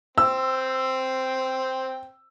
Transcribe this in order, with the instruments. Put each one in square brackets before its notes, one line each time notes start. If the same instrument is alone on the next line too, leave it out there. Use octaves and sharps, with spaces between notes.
[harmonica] C4 G5 [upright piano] E6